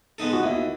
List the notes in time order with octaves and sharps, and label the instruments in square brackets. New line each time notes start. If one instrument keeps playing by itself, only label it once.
[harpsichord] G#3 B3 D#4 A4
[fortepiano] F#4
[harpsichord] D#2 [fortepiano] E4